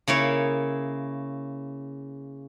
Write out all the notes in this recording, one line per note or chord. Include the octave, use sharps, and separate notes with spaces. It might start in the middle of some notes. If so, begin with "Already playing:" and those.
C#3 A#3 E4 C#5